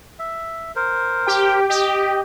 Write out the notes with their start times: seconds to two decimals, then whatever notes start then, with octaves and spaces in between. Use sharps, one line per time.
0.19 E5
0.76 A#4 C5
1.27 G4 G5
1.70 G4 D#5